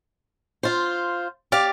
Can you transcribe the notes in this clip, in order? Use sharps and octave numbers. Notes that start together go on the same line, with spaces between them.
F4 C5
G4 D5 F5